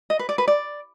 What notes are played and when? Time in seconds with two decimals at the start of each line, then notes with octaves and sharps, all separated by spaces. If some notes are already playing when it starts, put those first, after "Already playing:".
0.10 D#5
0.19 B4
0.29 D5
0.38 B4
0.48 D5